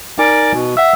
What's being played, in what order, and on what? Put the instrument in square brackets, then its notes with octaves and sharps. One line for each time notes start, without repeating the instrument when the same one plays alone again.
[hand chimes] D#4 G#5 [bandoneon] A#4 D5 D6
[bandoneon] B2
[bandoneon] E5 [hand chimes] F#5 E6